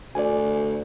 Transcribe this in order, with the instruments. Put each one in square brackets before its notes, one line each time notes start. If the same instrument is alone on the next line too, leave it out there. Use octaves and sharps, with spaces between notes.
[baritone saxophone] D2 [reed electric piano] D5 G#5